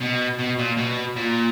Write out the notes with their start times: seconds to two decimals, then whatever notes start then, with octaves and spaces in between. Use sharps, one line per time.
0.01 B2
0.39 B2
0.59 A#2
0.78 B2
1.16 A#2